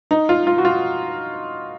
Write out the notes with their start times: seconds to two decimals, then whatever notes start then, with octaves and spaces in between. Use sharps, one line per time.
0.11 D#4
0.29 F4
0.47 F4
0.58 F#4
0.65 F4